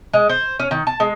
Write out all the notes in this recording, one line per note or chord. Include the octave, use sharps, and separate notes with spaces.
G#3
C5
C#4
D#3
A5
G#3